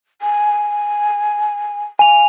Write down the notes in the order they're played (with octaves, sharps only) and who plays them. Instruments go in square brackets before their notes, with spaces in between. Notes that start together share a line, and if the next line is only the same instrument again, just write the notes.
[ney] G#5
[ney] F5 [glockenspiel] G#5 F7